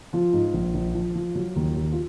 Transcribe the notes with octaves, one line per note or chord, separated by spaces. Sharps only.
F3 F4
G#2
A#1
A#1
F3
F3
F#3
D#2
D#2
F4